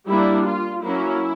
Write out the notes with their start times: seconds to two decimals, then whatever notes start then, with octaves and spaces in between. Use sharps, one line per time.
0.09 G3 A#3 D4 E4
0.47 F4
0.84 F#3 A#3 C#4 E4